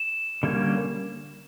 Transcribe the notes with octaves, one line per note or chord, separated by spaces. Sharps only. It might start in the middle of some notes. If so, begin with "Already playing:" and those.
Already playing: E7
D3 G3 A#3 C#4